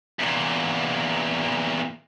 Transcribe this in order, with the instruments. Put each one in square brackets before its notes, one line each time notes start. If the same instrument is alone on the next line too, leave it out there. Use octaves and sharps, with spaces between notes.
[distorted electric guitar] E2 A#2